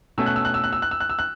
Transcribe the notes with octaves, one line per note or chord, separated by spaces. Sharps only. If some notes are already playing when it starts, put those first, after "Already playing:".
B2 A3 C#4 E6
F#6
E6
F#6
E6
F#6
E6
F#6
E6
F#6
E6
F#6